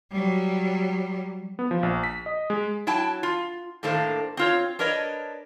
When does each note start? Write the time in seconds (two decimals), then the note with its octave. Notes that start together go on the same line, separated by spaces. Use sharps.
0.12 F#3 G3
1.59 B3
1.71 F3
1.83 A#1
2.04 B6
2.26 D#5
2.50 G#3
2.87 F#3 E4 G5 A5
3.23 F4
3.83 A2 D#3 A#3 D4 A4 C5
4.37 C4 F4 C#5
4.79 D4 A#4 B4 C#5 D#5